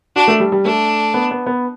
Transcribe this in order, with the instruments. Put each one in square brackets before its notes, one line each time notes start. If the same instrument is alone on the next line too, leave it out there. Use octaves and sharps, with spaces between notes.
[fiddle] D4 [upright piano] F#4
[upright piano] A3
G3
G3
[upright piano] A3 [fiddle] D4
[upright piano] B3
B3
B3